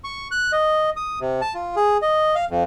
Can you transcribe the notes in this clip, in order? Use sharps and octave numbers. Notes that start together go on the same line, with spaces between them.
C#6
F#6
D#5
D#6
C3
A5
F4
G#4
D#5
F5
F2